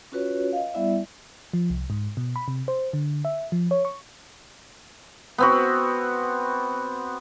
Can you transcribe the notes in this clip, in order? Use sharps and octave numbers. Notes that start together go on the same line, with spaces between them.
C#4 F4 F#4 B4 C#5
D#5 F5
G3 B3 E4 D5 E5
F3
C2
G#2
B2
B5
C3
C5
D3
E5
F3
C#5
C#6
B3 C4 F#4